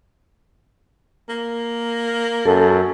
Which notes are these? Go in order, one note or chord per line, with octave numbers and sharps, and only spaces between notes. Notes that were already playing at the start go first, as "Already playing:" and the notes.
A#3
F#2 A4